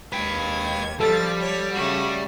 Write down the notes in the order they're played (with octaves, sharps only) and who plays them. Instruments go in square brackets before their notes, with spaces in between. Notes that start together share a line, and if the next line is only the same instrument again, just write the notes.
[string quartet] D#2 G#6 [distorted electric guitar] B4 G5
[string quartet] F3 A6 [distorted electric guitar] G3 [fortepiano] A4
[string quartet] C#5
C#3 A3 F#4